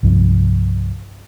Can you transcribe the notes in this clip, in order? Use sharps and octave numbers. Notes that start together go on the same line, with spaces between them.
C2 G2 C3 F3